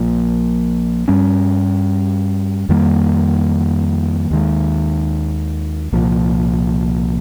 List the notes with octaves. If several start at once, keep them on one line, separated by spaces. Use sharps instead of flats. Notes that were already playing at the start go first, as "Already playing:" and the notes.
Already playing: A#1 A#2 F3
G2 G3 C#4
F2 D#3 G3 A#3
D#2 D#3 G#3
C2 A#2 F3